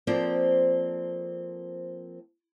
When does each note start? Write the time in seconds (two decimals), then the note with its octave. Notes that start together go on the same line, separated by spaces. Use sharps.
0.07 F3 A#3 C4 A4 C5 D5